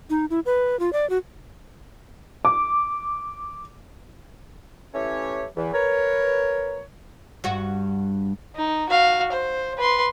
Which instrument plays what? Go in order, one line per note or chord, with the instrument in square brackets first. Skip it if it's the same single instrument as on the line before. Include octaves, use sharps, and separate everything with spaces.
[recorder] D#4
E4
B4
F4
D5
F#4
[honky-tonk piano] D6
[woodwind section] E3 A3 C#4 E4 G4 C#5
E2 E3
A#4 B4 C#5
[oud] G2 F#4
[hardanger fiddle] D#4
F#4 F5
C5
B4 C6